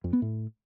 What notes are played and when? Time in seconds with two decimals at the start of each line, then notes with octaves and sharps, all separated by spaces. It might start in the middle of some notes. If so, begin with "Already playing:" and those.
0.04 F2
0.13 B3
0.22 A2